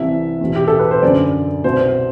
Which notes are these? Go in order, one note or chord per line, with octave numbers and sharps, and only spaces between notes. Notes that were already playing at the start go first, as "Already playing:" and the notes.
Already playing: C2 C3 E3 E5
E2 B2
G4
A4
B4
C5
F#2 D3 D5
C2 B2 C5